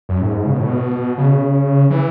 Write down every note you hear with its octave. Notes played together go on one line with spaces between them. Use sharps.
F#2
A2
G#2
C#3
B2
A2
B2
C#3
E3